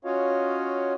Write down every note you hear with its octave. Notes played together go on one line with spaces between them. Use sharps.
C#4 F4 F#4 C#5 D#5 F5